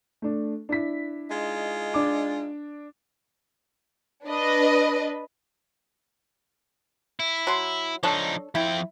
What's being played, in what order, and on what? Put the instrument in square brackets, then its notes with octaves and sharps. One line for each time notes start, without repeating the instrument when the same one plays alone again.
[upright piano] A3 D4
D4 E4 B6
[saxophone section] G#3 D#4 F4
[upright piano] D4 D6
[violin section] D4 B4 D#5
[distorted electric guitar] E4
[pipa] F#3 C6
[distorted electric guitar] F3 D#4 [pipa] D4 A4 C#5
[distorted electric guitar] F3 G5 [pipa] E4